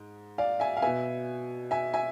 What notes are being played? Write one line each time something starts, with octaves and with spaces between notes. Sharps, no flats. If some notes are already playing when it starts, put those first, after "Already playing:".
Already playing: G#2 G#3
D5 F5
E5 G#5
F5
B2 B3 E5 G#5
E5 G#5
E5 G#5